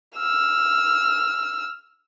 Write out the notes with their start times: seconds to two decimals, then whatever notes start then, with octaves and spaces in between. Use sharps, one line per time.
0.17 E6 F6